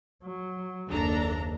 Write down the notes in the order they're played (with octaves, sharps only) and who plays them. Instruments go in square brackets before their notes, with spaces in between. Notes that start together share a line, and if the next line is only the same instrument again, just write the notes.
[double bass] F#3
[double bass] F#1 D#2 [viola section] D4 A4 A#5